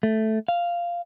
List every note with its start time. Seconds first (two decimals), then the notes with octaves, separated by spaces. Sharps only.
0.03 A3
0.48 F5